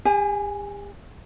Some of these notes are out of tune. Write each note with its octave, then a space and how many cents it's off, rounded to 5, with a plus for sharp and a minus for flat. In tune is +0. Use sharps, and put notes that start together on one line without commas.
G4 +45 G#5 +0